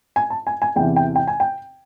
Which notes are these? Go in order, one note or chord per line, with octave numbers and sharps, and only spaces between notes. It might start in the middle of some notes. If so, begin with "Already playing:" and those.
G#5
A5
G#5
G#5
E2 C3 E3 G5
G5
G5
G#5
G5